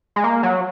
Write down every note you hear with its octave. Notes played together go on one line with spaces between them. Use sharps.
G#3
A#3
F#3